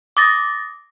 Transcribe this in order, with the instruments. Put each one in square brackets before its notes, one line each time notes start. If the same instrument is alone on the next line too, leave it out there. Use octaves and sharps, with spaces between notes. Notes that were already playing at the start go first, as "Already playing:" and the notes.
[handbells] D6 D#6 A6 A#6